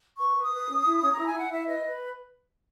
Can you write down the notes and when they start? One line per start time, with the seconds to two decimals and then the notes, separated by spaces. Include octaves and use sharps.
0.19 B4 C#6
0.35 B4
0.43 D#6
0.52 B4
0.68 C#4
0.84 E4
1.01 C#4
1.11 A#5
1.17 E4
1.24 G#5
1.33 E4 F#5
1.49 E4 E5
1.66 B4 D#5
1.83 B4